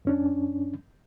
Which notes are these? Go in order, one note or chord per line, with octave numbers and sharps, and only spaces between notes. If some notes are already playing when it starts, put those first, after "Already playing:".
F#2 C#4 D4